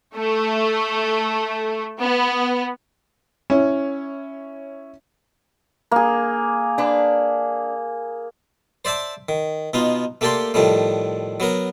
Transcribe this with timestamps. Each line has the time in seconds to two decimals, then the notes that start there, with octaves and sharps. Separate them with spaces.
0.16 A3
2.01 B3
3.50 C#4 E4 C#5
5.91 A#3 G#4
6.78 D4 B4
8.85 C5 D5 E5 A5 D6
9.29 D#3
9.74 B2 B3 D#4 F4
10.21 A3 A#3 G4 A4 D5 C6
10.54 A2 D#3 F3 G3 A3
11.40 F#3 B3 A#4